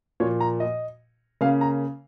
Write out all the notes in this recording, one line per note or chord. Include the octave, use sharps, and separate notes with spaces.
A#2 F3 A#3 C#5
A#5
D#5
C#3 A#3 C#4 F5
A#5